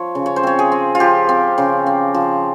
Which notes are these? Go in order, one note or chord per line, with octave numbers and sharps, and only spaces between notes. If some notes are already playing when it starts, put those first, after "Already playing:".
Already playing: F3 C#5
C#3
C#5
C5
C4 C#5
G#4
C4
F4
F3 G4
C4
C#3
C4
F3